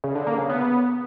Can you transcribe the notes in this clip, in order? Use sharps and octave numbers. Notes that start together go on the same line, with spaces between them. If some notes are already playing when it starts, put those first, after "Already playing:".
C#3
D3
A#3
C#3
B3